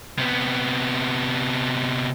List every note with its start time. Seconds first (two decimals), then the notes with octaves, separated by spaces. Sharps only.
0.19 C3 B3